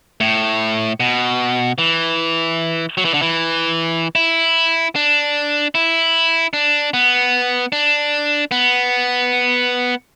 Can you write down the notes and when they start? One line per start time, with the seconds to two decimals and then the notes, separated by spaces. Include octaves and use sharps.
0.20 A2
1.00 B2
1.78 E3
2.97 F#3
3.05 E3
3.14 D3
3.22 E3
4.15 E4
4.96 D4
5.75 E4
6.53 D4
6.93 B3
7.72 D4
8.51 B3